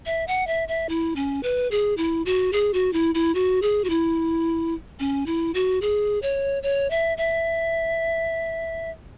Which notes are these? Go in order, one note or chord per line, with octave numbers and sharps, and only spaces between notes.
E5
F#5
E5
E5
E4
C#4
B4
G#4
E4
F#4
G#4
F#4
E4
E4
F#4
G#4
F#4
E4
C#4
E4
F#4
G#4
C#5
C#5
E5
E5